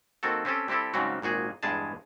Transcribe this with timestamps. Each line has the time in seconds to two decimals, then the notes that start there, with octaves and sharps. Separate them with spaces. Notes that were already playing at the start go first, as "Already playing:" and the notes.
0.23 D#3 A#3 C4 F#4 A4
0.45 C4 C#4 G4 A4
0.68 G3 C4 E4 G4 A4
0.94 G#2 C#3 F#3 G3 C4 F#4
1.22 G#1 A#2 F#4 G#4
1.63 E2 G2 G#3 G#4 A5